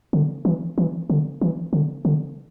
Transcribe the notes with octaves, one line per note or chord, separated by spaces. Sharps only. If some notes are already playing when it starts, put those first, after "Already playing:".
D3
E3
E3
D3
E3
D3
D3